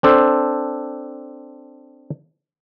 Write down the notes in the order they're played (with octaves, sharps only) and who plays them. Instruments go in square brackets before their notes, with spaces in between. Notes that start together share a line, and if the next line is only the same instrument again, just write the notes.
[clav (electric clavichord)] C4 D4 A4 C5